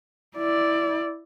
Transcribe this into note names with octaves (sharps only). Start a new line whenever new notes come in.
E4 D5